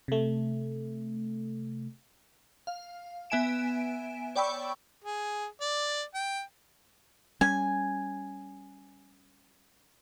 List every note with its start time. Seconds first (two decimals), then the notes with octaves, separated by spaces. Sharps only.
0.08 C3 A3
2.67 F5
3.30 B3 E5 G#5 D7 E7
4.36 C#5 D5 G5 B5 C#6 E6
5.04 G#4
5.61 D5
6.14 G5
7.41 G3 C#4 G#5